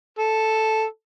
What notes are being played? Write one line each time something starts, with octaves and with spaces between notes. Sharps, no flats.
A4